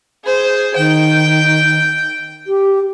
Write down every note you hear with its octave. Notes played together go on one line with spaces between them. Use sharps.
G#4 C5
D#3 G5
G4